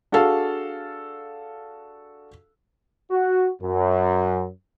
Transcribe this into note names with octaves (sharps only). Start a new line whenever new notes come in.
D4 F#4 G#4 A4 F5 A5
F#4
F#2